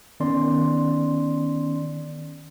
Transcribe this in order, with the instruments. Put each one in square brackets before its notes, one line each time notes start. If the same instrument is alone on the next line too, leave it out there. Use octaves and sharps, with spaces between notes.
[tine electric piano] D#3 B3 C#4 D5 C6